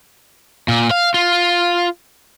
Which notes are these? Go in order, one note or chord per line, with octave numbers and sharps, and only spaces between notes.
A#2
F5
F4